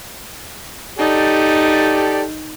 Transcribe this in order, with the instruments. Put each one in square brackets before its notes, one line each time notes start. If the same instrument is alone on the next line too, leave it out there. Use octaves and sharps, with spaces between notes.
[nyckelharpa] D#4 [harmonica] G4 A4 D5